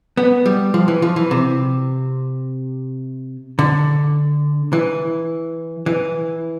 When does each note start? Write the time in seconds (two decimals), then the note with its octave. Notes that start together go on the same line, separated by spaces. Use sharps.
0.17 B3
0.46 G3
0.74 F3
0.88 E3
1.02 F3
1.16 E3
1.31 C3
3.59 D3
4.73 E3
5.86 E3